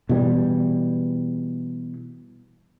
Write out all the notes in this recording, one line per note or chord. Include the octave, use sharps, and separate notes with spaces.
B2 E3 G3